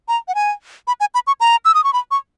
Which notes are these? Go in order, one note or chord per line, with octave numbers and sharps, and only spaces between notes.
A#5
F#5
G#5
B5
G#5
B5
C#6
A#5
E6
D#6
C#6
B5
C#6